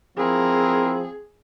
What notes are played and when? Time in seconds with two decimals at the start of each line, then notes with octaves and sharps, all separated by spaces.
0.18 F3 C4 E4 G#4 A#4